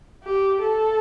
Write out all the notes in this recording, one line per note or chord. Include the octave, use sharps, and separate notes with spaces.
G4
A4